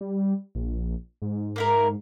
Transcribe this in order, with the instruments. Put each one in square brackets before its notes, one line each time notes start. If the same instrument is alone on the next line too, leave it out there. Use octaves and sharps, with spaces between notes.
[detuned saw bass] G3
A#1
G#2
[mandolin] A#3 E4 A#4